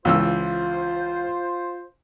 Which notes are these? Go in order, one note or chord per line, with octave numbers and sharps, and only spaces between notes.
C#2 E3 F4 C5 E6